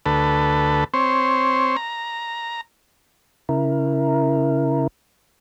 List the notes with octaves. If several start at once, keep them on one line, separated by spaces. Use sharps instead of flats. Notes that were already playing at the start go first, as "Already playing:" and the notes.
D2 A4 B4
C4 C5 C#5
A#5
C#3 E4 A#4